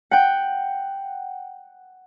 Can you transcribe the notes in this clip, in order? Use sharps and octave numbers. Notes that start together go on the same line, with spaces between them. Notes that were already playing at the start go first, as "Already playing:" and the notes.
F#5 G5